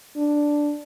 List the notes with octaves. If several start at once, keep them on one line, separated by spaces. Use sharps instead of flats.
D4